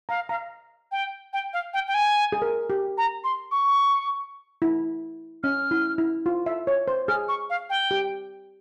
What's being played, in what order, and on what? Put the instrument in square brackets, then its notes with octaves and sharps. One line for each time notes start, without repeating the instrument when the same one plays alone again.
[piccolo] F5 [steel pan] A#5
[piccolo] F5 [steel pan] A#5
[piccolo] G5
G5
F5
G5
G5
G#5
[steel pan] G#4
A#4
G4
[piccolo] A#5
C6
C#6
[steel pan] E4
[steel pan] C#4 [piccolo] F6
[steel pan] E4
E4
F4
E5
C#5
C5
[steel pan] G#4 [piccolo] F6
[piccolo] C#6
F5
G5
[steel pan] G4